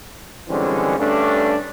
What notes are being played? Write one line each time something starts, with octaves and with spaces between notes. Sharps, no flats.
D3 E3 G3 G#3 C4 C#4
G2 A3 C#4 D4